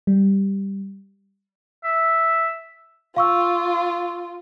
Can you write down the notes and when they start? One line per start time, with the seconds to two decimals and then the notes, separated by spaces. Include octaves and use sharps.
0.07 G3
1.84 E5
3.16 F4 F5 C#6 E6